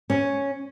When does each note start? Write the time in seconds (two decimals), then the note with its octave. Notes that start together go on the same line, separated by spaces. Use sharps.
0.10 C#4